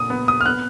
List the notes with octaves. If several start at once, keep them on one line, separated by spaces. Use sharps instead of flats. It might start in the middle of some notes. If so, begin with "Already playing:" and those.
Already playing: A#2 D#6
B3
D#6
F6
B3 F#6